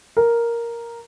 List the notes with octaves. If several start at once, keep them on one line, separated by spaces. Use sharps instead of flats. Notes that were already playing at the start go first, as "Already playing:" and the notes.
A#4